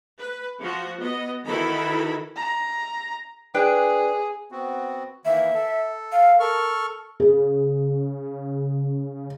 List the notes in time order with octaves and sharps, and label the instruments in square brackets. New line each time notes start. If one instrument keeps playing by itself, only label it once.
[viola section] B4
F3 F#4
B3 D#5
D#3 E3 E4 F#4 A4 B5
[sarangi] A#5
[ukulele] D4 B4 G5 [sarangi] G#4
[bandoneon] B3 C4 F#4
[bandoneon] D#3 E3 A#3 [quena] E5
[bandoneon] A4
[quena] F5
[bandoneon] A4 C#6 F6 [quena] A#4
[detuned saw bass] C#3 [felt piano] G#4